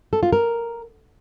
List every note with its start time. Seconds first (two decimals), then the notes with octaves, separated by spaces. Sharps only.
0.13 A4
0.23 F4
0.33 A#4